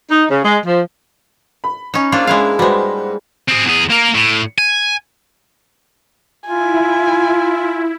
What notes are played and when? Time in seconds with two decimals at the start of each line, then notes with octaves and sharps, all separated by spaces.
0.11 D#4
0.31 C#3
0.45 G#3
0.67 F3
1.64 B5
1.94 C#4 D#4
2.12 G#2 A#3 D4 F4
2.27 G#3 C#4 E4 F5
2.59 G3 G#3 F#4 B4 C5
3.48 C4 G#4
3.66 E2 G#4
3.90 A#3 A#4
4.15 A2
4.58 G#5
6.47 E4 F4 G#5